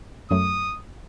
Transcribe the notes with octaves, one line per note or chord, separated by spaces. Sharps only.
F#2 F#3 A3 D#6